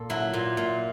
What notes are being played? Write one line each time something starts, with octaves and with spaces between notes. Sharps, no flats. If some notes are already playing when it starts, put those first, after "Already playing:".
Already playing: A#2 A4
F#3 E4
A#2
A#2